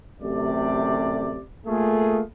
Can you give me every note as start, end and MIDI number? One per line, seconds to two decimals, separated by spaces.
0.22 1.40 33
0.22 1.40 42
0.22 1.40 48
0.22 1.40 57
0.22 1.40 67
0.22 1.40 74
1.66 2.21 57
1.66 2.21 58
1.66 2.21 65
1.66 2.21 68